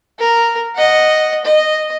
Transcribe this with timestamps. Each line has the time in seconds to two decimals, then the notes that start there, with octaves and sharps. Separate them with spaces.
0.19 A#4
0.75 D#5 F#5
1.45 D#5